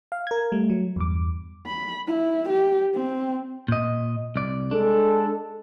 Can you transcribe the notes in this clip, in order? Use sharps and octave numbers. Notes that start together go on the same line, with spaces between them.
F5
A#4 G#6
G3 A3
F#3
E2 G2 D6
B5
E4
G4
C4
A#2 D#5
C2 D5
G#3 D4 A4